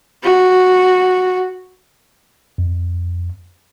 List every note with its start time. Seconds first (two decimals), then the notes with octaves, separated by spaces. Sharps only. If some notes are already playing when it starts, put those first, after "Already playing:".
0.24 F#4
2.58 F2